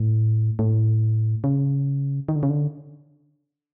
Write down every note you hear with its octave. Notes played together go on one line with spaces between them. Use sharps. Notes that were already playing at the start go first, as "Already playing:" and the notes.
Already playing: A2
A2
C#3
D#3
D3
C#3
D3